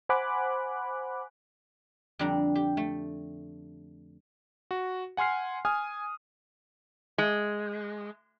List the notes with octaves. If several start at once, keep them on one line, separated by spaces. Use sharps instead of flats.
C5 F#5 G#5 B5 D6 F#6
F2 D3 G3 D4 A#5
G4
A3
F#4
F#5 G#5 C6 F6 C7
G#5 D#6 F6
G#3